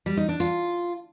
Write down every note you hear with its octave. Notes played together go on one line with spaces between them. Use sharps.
G3
D#4
D4
F4